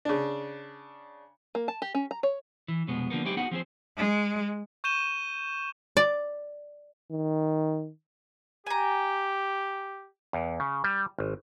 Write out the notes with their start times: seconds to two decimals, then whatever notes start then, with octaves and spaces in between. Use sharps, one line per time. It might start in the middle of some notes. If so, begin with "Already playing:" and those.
0.05 C#3 D4
1.55 A#3
1.68 A5
1.82 G4
1.95 C#4
2.11 A#5
2.23 C#5
2.68 E3
2.87 C2 F2 B2 G#3 B3
3.10 D3 F3 A#3 B3
3.25 F#3 G#3 C4 D#4 E4 G4
3.37 B3 D#4 F#4 G#4 F#5
3.51 F3 C4 G#4 C5
3.97 G#3
4.84 C#6 G6 D#7 E7 G7
5.97 D5
7.11 D#3
8.67 G4 G#5 A#5
10.33 E2
10.60 C#3
10.84 G3
11.19 G#1